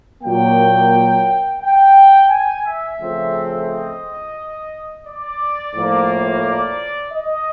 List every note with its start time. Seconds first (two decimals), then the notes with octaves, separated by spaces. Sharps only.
0.22 A#2 F#3 A#3 G5
1.61 G5
2.30 G#5
2.65 E5
2.99 C#3 F3 A3 C4
3.68 D#5
5.06 D5
5.75 A2 F3 A#3
6.43 D5
7.12 D#5